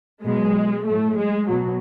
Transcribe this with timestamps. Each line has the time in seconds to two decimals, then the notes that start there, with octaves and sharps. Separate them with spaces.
0.25 B2 F#3 G#3
0.87 A2 F#3 A3
1.18 G#3
1.49 B2 F#3